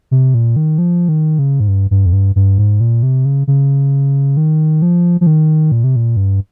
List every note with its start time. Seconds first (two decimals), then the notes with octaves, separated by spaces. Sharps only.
0.11 C3
0.34 A#2
0.56 D#3
0.78 F3
1.09 D#3
1.39 C#3
1.60 G#2
1.68 G2
1.91 G2
2.06 F2
2.13 G2
2.36 G2
2.58 G#2
2.80 A#2
3.03 C3
3.25 C#3
3.47 C#3
4.37 D#3
4.82 F3
5.21 F3
5.27 D#3
5.72 A#2
5.84 C3
5.96 A#2
6.17 G2